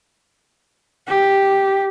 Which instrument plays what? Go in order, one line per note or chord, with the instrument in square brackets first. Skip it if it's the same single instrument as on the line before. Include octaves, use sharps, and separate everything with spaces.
[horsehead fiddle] G4